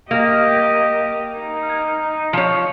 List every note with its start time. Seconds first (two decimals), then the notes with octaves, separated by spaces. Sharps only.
0.11 A#3 G4 D#5
1.37 D#4
2.33 F3 C#5